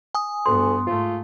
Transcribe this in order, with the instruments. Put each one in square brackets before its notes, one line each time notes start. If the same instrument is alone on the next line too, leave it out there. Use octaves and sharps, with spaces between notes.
[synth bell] G#5 D#6
[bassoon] D2 [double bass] G2 B3 [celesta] C6
[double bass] G#2 A3 [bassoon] F4